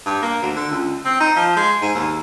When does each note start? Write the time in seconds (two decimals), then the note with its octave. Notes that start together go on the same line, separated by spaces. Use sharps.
0.06 G2
0.22 A#3
0.42 D2
0.56 D3
0.71 C#2
1.05 C4
1.20 D#4
1.36 F3
1.57 G#3
1.82 G#2
1.95 D#2